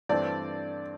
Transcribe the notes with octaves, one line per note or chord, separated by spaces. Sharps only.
G2 E3 A3 C4 D5